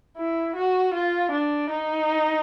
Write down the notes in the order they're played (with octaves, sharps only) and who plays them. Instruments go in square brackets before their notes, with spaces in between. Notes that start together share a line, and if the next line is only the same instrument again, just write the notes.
[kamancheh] E4
F#4
F4
D4
D#4